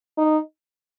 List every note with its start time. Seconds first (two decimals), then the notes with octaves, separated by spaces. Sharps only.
0.18 D#4